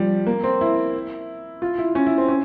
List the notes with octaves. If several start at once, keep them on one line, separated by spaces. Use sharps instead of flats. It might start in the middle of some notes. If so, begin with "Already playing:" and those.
Already playing: F3 G3
A#3
C4
E4
F4
E4
C#4
E4
C4
C#4